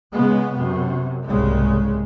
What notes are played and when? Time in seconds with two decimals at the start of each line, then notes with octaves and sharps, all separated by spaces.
0.14 C#3 G#3 B3
0.57 F#2 C3
1.28 F#1 C2 G#2 C#3 G#3